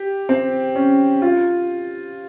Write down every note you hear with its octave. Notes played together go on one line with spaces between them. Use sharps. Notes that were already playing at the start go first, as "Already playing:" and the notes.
Already playing: G4
C4
C#4
F4